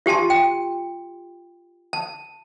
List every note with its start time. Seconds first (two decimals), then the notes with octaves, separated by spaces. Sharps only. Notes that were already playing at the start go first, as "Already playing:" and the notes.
0.06 F4 G4 G#5 A5 C6
0.30 G5
1.93 A5